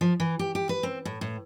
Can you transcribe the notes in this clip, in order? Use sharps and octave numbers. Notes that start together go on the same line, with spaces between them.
F3
E3
G4
G4
B4
C4
A2
A2